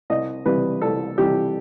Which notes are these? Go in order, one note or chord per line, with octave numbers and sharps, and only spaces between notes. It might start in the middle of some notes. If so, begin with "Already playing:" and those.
C2 D#5
C3 E3 G3 B4
C2 A4
C3 E3 G3 G4